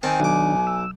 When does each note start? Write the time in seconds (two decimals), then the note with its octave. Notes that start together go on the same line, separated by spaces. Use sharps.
0.03 D#3 C4 G#5 A5
0.20 B1 D#3 D4 D6
0.67 E6